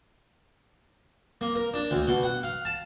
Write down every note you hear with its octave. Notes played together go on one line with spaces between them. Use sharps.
A#3
A#4
D4
D2
B2
F#5
F5
A5